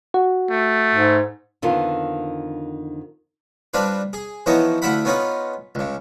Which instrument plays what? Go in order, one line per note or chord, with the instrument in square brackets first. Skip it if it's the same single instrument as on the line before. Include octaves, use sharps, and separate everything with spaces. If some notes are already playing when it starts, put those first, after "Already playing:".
[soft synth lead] F#4
[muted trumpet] A3
[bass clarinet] G#2
[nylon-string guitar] F2 D3 D#3 B3 F4
[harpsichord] G3 C4 D4 F4 B4
G#4
E3 F3 B3 D#4 C#5 D#5
D2 E4 F4 E5 F#5 B5
B3 C#4 D#4 F4 B4
C#2 C#3